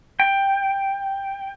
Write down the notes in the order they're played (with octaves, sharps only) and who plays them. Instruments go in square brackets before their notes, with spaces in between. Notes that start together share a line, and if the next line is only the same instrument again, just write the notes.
[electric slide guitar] G5